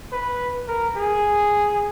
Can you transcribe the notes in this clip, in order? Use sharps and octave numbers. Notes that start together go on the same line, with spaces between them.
B4
A#4
G#4